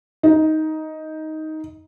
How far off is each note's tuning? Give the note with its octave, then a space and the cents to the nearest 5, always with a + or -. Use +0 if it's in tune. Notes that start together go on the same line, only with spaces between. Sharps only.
D#4 +10